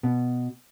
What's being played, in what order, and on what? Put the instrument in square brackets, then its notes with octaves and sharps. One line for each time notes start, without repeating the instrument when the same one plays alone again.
[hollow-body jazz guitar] B2